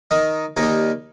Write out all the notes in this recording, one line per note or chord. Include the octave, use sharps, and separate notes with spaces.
D#3 D#4
D#2 D#3 D#4
G3